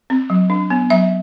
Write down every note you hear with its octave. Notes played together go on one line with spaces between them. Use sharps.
C4
F#3
D4
B3
F#3 E5